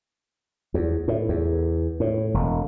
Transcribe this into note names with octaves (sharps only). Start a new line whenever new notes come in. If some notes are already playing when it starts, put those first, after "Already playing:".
E2
A2
E2
A2
E1